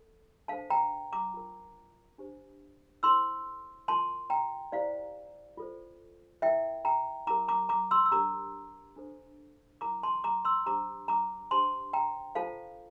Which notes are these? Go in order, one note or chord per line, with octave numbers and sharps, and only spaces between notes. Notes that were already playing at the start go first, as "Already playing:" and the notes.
Already playing: A4
D4 A4 C5 F5 A5
G5 A#5
A#5 D6
F4 A#4
D4 G4 C5
E4 A4 C5 C6 E6
F4 A#4 A5 C6
G5 A#5
E4 G4 C5 D5 F5
F4 A4 C5
E4 A#4 E5 G5
G5 A#5
E4 G4 A#4 A#5 D6
A#5 D6
A#5 D6
C6 E6
E6
D4 G4 A#4 A#5 D6
D4 A4 C5
E4 A#4 A#5 D6
A5 C6
A#5 D6
C6 E6
D4 G4 C5 A#5 D6
A#5 D6
D4 G4 C5 A5 C6
G5 A#5
F4 A4 C5 F5 A5